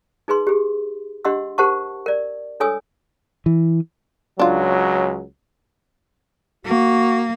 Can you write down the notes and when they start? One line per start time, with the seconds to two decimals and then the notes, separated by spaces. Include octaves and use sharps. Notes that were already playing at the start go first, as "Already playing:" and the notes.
0.28 D#4 G#4 B4 C6
0.47 G4 G#4
1.25 D4 G4 D#5 F#5 C6 E6
1.58 G4 A#4 C5 F#5 A5 C#6
2.06 A#4 D5
2.60 D4 A4 C#5 G#5 D#6 E6
3.46 E3
4.39 C#2 F#3 D4 F4
6.66 A#3 F#4